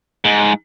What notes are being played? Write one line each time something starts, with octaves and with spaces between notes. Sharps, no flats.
G#2